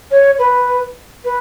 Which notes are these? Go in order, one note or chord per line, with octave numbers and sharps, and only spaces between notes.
C#5
B4
B4